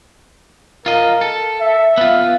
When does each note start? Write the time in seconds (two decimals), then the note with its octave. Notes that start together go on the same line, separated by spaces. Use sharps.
0.86 F4 A#4 D#5
1.21 A4
1.61 E5
1.98 B3 F4